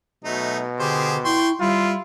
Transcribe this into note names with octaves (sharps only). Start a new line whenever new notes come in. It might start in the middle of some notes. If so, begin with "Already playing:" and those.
B2 F#3 A3 D#4
D3 G4 G#4 C5
E4 G5 C6 C#6
G3 E4 F4